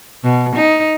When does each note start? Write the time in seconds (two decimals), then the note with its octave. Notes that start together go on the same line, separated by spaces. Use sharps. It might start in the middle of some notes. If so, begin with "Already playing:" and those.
0.24 B2
0.56 D#4